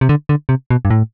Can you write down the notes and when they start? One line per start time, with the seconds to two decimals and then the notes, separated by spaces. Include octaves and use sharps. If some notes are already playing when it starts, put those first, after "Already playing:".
0.01 C3
0.09 D3
0.29 D3
0.49 C3
0.70 B2
0.85 G2
0.91 A2